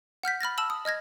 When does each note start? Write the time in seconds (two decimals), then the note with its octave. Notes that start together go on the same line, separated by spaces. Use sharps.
0.23 F#5 F6 G6 B6
0.41 B5 F6 A6 A#6
0.58 A5 E6 F#7
0.70 D#6
0.85 D#5 F6 G#6 A#6